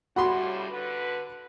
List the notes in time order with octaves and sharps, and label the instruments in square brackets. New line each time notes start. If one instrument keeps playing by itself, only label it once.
[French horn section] A2 C#3 G3 [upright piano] F#4 [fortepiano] F#5 B5 C6
[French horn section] D3 B4